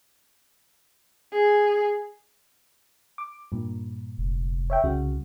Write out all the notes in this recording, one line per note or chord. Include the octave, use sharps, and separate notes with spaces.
G#4
D6
G2 A#2
F1
C#5 E5 G5
C2 C#3 F#4